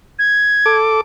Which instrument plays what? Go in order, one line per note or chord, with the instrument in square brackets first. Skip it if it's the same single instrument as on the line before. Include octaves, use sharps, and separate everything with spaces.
[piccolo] G#6
[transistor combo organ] A4 D6